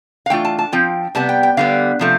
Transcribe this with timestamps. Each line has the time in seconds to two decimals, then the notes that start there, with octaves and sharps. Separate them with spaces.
0.26 F5
0.30 E3 A3 D4 F4 G5
0.45 A5
0.59 A5
0.72 F3 C4 F4 G5
1.15 C3 G3 B3 A5
1.29 G5
1.43 G5
1.57 D3 G3 B3 F5
1.99 C3 F3 A3